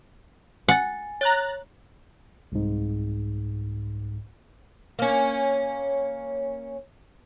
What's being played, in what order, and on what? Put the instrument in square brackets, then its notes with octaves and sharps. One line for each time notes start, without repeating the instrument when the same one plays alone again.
[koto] F#5 [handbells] G#5 A6
[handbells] C#5 [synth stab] A#5 F#6 A6
[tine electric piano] C2 G#2
[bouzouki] A#3 C#4